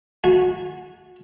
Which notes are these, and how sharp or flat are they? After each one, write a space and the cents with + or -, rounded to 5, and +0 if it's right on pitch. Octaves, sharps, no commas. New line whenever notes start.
F#4 -20 G#5 -25